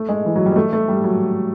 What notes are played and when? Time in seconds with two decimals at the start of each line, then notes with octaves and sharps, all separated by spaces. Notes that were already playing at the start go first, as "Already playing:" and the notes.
Already playing: A3
0.09 G#3
0.25 E3
0.35 F#3
0.46 G3
0.52 G#3
0.56 A3
0.73 A3
0.88 G3
1.04 F#3